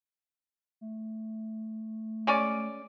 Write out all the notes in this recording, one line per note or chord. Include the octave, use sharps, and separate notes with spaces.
A3
G#3 C#4 D5